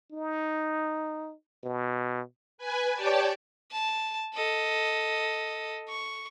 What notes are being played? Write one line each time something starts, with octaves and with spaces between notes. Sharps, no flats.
D#4
B2
B4 G#5
G4 C#5 D5 G5 A5
A5
A4 D#5
C#6